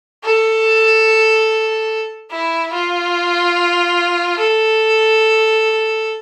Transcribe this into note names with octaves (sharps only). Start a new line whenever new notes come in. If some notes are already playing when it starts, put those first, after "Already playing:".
A4
E4
F4
A4